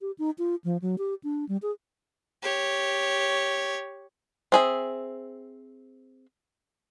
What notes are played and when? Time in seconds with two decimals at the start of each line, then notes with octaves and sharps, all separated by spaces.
0.01 G4
0.19 D#4
0.38 F4
0.64 F3
0.82 F#3
0.98 G4
1.24 D4
1.49 G3
1.62 G#4
2.43 G4 C#5
4.52 C4 G#4 E5